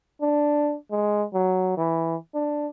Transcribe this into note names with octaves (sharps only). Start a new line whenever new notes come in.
D4
G#3
F#3
E3
D4